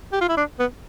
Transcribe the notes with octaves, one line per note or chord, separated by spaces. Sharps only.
G4
F4
E4
D4
B3